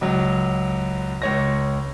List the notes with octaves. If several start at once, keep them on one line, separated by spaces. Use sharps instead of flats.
C#2 F#3
C#2 C#5 A#6